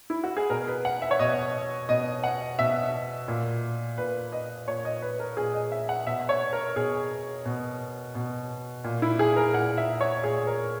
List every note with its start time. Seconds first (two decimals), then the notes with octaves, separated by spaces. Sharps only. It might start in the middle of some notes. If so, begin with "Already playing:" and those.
0.10 E4
0.24 F#4
0.37 G#4
0.50 B2 A#4
0.68 B4
0.85 F#5
1.02 E5
1.11 C#5
1.19 B2 D#5
1.89 B2 D#5
2.24 F#5
2.59 B2 E5
3.28 A#2
3.98 A#2 B4
4.32 D#5
4.67 A#2 C#5
4.85 D#5
5.02 B4
5.20 A#4
5.37 A#2 G#4
5.54 D#5
5.72 E5
5.89 F#5
6.06 B2 E5
6.29 C#5
6.53 A#4
6.76 B2 G#4
7.45 B2
8.15 B2
8.84 A#2
9.02 E4
9.19 G#4
9.36 A#4
9.54 A#2 F#5
9.78 E5
10.01 C#5
10.24 A#2 G#4
10.47 A#4